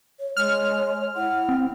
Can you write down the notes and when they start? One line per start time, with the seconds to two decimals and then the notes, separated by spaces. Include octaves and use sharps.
0.20 C#5
0.37 G#3 C#5 F6
1.16 E4 F#5
1.49 C4